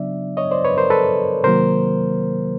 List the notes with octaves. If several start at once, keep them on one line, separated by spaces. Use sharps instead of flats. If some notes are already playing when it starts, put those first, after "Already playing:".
Already playing: C#3 F#3 B3 D4 D5 E5
C#5 D#5
C5 D5
B4 C#5
A#4 C5
A4 B4
C3 D#3 F#3 A#3 A#4 C5